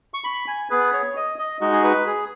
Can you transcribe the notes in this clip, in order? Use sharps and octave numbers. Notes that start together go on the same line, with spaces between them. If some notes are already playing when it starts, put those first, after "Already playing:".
C#6
B5
G#5
B3 G#4 B4
C#5
D#5
D#5
G#3 D#4 F#4 D#5
G#4
B4
G#4